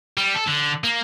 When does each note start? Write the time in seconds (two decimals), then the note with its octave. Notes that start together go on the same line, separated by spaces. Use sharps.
0.17 G3
0.34 A4
0.47 D3
0.84 A#3